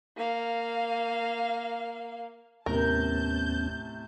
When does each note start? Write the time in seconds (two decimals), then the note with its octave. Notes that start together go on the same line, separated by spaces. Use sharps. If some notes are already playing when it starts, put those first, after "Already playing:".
0.17 A#3 F5
2.66 D#2 A2 C3 B3 C#4 A#4 A5 G6